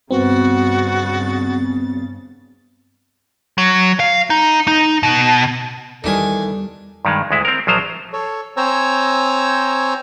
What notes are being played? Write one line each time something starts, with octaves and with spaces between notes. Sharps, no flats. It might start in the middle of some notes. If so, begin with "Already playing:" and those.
G2 C#3 B3 C4 F#4 A6
F#3
F5
D#4
D#4
B2
E2 D#3 E3 G3 D4 D#4 A4 G#5
G2 D#3 G#3
D2 G#3 E4
C4 A#4
A#1 F3 F#3 C5 A#5
A4 C#5
C4 C5 C#5 G#5 A#5 E6